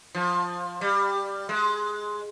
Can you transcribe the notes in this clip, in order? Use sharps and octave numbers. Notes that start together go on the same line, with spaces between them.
F3
G3
G#3